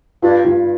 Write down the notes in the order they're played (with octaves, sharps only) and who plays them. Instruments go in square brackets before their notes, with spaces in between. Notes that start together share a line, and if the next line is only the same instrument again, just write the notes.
[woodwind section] G2 [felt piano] F4
[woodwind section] G2 [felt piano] F4